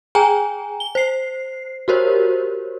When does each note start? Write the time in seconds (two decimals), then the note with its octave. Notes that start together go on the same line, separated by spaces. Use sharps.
0.15 G#4 G5 G#5 A#5
0.80 G7
0.95 C5 C7
1.88 F#4 G4 A#4 C5 C#5